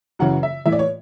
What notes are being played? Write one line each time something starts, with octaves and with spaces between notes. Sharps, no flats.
F#2 C#3 E3 F#5
E5
A2 E3 E5
D5
C#5